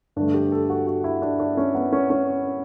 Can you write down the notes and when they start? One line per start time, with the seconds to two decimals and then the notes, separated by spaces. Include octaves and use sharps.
0.16 G2 D3 A3 D4
0.34 G4
0.52 A4
0.70 F#4
0.87 F#4
1.04 E4
1.22 D4
1.40 D4
1.57 C#4
1.75 B3
1.93 C#4
2.10 C#4